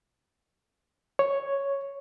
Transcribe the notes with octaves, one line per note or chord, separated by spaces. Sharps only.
C#5